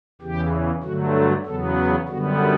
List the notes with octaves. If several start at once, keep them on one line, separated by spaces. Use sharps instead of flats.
E2 C#3 E3 G4
G2 D3 F#3 A3 F#4
A4
E2 C#3 F#3 B3 A4
B4
F#2 D3 G3 B3 F#4